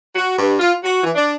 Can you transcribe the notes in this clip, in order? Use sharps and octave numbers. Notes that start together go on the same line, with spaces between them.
F#4
G2
F4
F#4
E3
D4